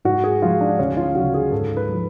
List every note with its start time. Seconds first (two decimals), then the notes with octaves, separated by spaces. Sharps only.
0.05 G#2 F#4
0.24 G#4
0.42 F3 G#3 F4
0.61 D4
0.79 D2 C#4
0.97 F4
1.15 C#3 F#3 F#4
1.34 G#4
1.52 G#2 A4
1.77 B4
1.89 F3 G#3